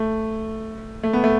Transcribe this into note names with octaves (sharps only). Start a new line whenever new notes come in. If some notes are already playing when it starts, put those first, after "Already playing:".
Already playing: A3
A3
B3
A3